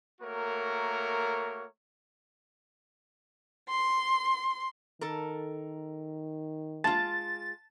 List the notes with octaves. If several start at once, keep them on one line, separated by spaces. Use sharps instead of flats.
A3 A#3 F#4 A#4 C#5
C6
D#3 A4 A#4
G#3 F4 A5 A6